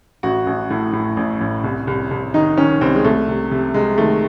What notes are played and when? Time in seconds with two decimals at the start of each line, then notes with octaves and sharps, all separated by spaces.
0.23 A1 F#4
0.47 A1
0.70 A2
0.93 A2
1.17 A1
1.41 A1
1.64 C2
1.87 C2
2.11 C2
2.34 D#3 D#4
2.57 D#3 C#4
2.81 C2 C4
2.95 G#3
3.04 C2 A3
3.28 C3
3.51 C3
3.74 C3 G#3
3.98 D#3 A3